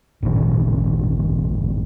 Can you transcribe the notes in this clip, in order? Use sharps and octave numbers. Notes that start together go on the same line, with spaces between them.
D1 G#1 A#2 D4